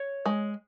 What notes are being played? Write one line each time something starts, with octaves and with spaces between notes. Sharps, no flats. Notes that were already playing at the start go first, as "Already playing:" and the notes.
Already playing: C#5
G#3